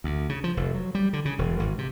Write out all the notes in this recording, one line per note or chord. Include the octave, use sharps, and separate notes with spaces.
D2
C#3
F3
F1
F#3
G3
D3
C#3
E1
G#1
C3